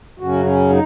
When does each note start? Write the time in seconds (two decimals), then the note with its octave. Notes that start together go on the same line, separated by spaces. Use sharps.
0.20 F#2 C#3 F#3 C#4 F#4
0.45 C#4
0.70 D#4